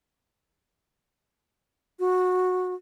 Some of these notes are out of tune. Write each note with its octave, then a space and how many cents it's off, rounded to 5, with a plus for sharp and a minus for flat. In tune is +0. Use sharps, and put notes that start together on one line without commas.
F#4 -15